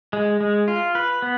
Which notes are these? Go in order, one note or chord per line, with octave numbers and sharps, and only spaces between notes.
G#3
G#3
F4
B4
B3